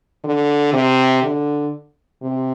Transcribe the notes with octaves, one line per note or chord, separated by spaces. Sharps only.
D3
C3
D3
C3